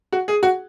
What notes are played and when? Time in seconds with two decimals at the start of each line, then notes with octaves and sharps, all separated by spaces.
0.12 F#4
0.28 G#4
0.43 F#4